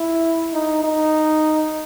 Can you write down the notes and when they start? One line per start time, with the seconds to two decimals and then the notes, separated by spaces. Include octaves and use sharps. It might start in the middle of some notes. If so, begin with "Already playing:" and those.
Already playing: E4
0.53 D#4
0.83 D#4